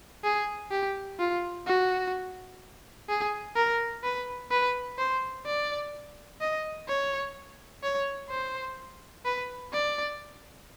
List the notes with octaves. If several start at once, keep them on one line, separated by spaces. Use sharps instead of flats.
G#4
G4
F4
F#4
G#4
A#4
B4
B4
C5
D5
D#5
C#5
C#5
C5
B4
D5